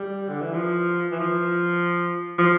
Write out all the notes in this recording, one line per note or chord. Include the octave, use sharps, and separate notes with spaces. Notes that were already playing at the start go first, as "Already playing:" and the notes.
Already playing: G3
D3
E3
F3
E3
F3
F3